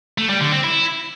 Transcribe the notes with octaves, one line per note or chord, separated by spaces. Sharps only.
A3
G3
D3
C4
E4